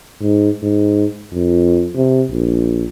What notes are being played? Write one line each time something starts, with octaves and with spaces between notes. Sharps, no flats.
G#2
G#2
F2
C3
A#1